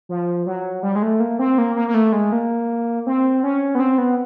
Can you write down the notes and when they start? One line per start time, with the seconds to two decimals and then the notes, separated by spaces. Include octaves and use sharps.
0.09 F3
0.46 F#3
0.83 G3
0.95 G#3
1.02 A3
1.20 A#3
1.39 C4
1.58 A#3
1.76 A#3
1.88 A#3
1.94 A3
2.13 G#3
2.32 A#3
3.07 C4
3.43 C#4
3.75 B3
3.80 C4
3.98 B3